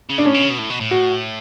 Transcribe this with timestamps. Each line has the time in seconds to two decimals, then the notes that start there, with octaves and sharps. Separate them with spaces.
0.09 C#3
0.18 D4
0.25 A2 C#4
0.34 B2
0.42 C#3
0.50 B2
0.59 A2
0.70 B2
0.80 A2
0.91 F#4